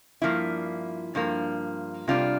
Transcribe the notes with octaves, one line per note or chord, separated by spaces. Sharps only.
G2 F3 A#3 E4
G2 F3 A#3
C3 G3 D4 F4